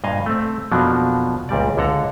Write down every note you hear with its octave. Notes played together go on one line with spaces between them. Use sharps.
G2 A#2 D#5 F5 G#5
A3 C4
F2 B2 F3 F#3 A#3 D4
C#2 A#2 G3 D5
C#2 D3 A4 F#5 A#5